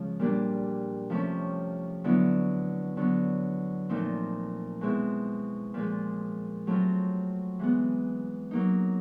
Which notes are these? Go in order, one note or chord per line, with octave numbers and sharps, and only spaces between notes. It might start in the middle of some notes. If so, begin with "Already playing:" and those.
Already playing: C#3 F3 G#3
A#2 G3 A#3 D4
C3 F3 A3 C#4
D3 F#3 B3 E4
D3 F#3 B3
A#2 F3 A3 C4 D#4
B2 G#3 C4 E4
A#2 F3 G#3
F#3 A3 C4 F4
E3 G#3 B3
F#3 A#3 D#4